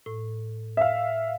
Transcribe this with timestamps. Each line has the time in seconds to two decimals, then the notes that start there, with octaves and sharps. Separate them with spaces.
0.06 A2
0.77 E5 F5